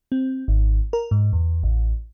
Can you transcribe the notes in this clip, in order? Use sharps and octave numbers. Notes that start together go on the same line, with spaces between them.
C4
G#1
A#4
G#2
E2
A1